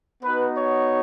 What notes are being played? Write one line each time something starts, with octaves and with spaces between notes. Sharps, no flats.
B3 D#4 F#4 B4
C#5